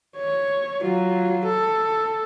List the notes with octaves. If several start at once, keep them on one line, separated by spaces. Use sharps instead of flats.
C#5
F#3 F4
A4